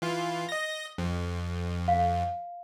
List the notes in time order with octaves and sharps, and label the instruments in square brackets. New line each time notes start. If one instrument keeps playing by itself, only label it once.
[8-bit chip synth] E3 F4
D#5 A#6
F2
[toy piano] F5